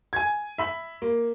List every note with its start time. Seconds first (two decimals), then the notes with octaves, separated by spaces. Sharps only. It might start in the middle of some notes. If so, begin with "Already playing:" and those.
0.13 G#5 G#6
0.58 E5 B5 B6
1.02 A#3